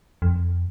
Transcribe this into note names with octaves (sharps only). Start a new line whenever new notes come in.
F2